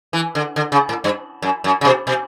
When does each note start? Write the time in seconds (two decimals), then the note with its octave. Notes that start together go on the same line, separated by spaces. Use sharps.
0.13 E3
0.35 D3
0.56 D3
0.72 C#3
0.89 A2
1.04 G2
1.42 F#2
1.64 F#2
1.81 C#3
1.85 B2
2.07 B2